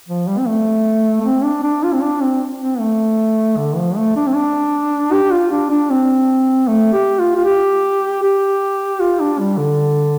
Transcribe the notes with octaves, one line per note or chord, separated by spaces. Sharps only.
F3
G3
C4
A3
A3
C4
D4
D4
F4
C4
D4
C4
C4
A3
D3
F3
A3
D4
C4
D4
G4
F4
D4
D4
C4
A3
G4
F4
F4
G4
G4
F4
D4
G3
D3